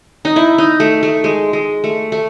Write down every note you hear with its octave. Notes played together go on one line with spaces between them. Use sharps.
D#4
E4
D#4
A3
A3
G#3
G#3
A3
A3